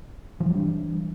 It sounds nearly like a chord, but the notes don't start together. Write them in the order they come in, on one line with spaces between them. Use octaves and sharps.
F3 E3 G3 D4